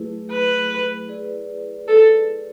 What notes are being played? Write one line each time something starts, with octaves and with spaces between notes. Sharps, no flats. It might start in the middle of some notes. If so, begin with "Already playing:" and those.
Already playing: F#3 A3 E4 G#4 B4
B4
E4 G#4 B4 D5
A4